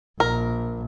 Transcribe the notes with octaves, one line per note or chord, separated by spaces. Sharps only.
A#1 A#4